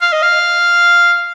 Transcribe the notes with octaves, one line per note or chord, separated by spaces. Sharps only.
F5
D#5
F5